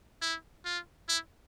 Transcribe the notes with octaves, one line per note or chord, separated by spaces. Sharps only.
E4
F4
E4